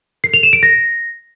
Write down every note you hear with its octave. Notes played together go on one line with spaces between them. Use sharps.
C7
F7
E7
D7
A#6